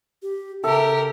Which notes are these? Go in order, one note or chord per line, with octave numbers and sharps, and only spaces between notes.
G4
C#3 G4 A4 A#4 E5